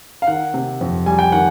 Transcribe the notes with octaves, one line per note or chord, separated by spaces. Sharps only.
F5
D#3 F#5
C3
F2
G3 G#5
G5
D#3 F#5